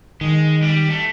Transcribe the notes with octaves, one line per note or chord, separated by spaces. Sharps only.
D#3 G#3
G3 G4
A3